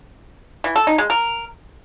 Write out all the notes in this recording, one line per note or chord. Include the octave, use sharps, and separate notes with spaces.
E3
A4
D#4
G#3
A#4